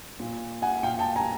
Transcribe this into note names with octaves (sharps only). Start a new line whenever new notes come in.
A#2
F#5 G#5
A#2 F5 G5
G5 A5
G#5 A#5